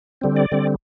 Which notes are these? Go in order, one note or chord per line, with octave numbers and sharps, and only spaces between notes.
D3 G3 C4
D5
D3 G3 C4